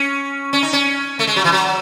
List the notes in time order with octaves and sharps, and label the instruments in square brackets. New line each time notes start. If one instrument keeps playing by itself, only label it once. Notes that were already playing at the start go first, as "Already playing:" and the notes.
Already playing: [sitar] C#4
C#4
D#4
C#4
A3
G#3
F#3
E3
F#3